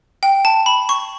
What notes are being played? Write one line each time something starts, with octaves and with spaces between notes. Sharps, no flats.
G5
A5
B5
C#6